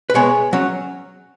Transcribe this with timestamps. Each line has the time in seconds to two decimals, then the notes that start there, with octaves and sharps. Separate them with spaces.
0.10 B4
0.14 B2 G#3 B3 G#4 C#5
0.53 F#3 C#4